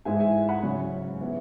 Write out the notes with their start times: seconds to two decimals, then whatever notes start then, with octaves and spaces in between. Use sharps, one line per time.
0.05 G#2 E3 G#3 E4 E5 G#5
0.20 E5 G#5
0.49 F#5 B5
0.63 C#3 F#3 C#4
1.21 E3 B3 E4